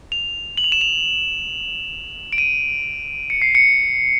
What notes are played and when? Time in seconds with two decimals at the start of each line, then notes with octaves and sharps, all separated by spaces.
0.12 F7
0.57 F#7
0.64 F7
0.72 E7
0.81 F7
2.33 D7
2.38 D#7
3.30 C#7
3.42 C7
3.55 C#7